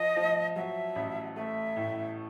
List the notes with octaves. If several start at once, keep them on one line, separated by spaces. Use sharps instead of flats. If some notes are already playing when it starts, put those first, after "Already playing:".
Already playing: F3 D#5
F3
F#3 E5
A1
A3 E5
A2